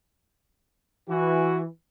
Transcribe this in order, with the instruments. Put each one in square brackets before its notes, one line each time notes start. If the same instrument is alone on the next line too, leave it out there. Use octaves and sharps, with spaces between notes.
[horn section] E3 [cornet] F#4